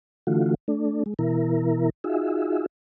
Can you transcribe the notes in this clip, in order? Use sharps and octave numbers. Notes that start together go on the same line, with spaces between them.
D3 E3 A3 F4 F#4
A3 D4
G#3
B2 E3 E4 A#4
D#4 F4 F#4 G#4 E5